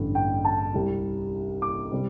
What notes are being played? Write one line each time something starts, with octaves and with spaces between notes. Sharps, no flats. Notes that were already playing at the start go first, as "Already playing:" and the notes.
Already playing: A1 G2 D3
G5
A5
C2 C3 G3
D6
C3 G3 C4